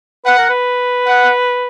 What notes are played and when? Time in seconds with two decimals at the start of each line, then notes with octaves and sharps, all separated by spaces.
0.25 B4 F#5
0.38 A#4
0.49 B4
1.06 F#5